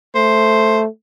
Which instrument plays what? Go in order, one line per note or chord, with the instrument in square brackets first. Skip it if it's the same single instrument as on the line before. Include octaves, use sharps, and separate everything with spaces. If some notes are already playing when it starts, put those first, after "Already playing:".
[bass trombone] A3 [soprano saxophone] C5